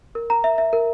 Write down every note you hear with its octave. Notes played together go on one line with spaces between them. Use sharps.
A#4
A#5
E5
E5
A#4